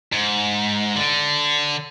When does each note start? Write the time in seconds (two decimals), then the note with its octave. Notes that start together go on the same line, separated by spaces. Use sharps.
0.13 G#2
0.96 D3